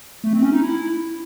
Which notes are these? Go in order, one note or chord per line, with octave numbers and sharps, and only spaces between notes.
A3
C4
C#4
D#4
E4